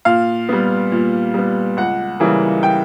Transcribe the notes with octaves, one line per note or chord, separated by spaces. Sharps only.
A#2 F5
G3 B3
A#2
G3 B3
C#2 F#5
C#3 E3 G3 A#3
G5